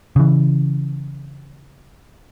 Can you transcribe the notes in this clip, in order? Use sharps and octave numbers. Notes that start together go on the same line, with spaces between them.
C#3 E3